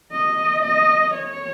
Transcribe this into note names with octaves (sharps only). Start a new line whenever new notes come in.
D#5
D#5
C#5